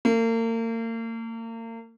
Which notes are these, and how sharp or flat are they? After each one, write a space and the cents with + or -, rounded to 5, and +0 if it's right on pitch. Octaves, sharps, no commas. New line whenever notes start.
A#3 -40